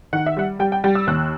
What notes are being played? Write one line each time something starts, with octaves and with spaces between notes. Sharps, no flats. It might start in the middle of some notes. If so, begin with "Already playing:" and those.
D#3 F#5
E5
G3 F#5
G3 G5
G5
G3 G5
E6
D#2 F#6